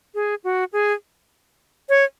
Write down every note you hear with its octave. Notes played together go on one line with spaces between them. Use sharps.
G#4
F#4
G#4
C#5